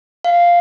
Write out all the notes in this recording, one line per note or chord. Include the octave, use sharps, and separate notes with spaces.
F5